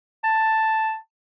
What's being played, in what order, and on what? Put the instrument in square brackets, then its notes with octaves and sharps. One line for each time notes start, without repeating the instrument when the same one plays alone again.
[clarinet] A5